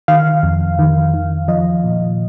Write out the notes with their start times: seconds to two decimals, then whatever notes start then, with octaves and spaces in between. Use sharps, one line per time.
0.08 D#3 F5
0.43 F2
0.79 D#3
1.14 D#3
1.48 F3 D#5
1.84 A#2